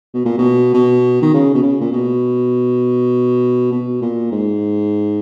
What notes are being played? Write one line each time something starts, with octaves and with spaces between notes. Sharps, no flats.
B2
A#2
B2
B2
D#3
C#3
B2
C#3
A#2
B2
B2
A#2
G#2